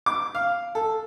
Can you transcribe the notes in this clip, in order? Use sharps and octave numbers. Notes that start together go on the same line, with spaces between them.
D6
F5
A4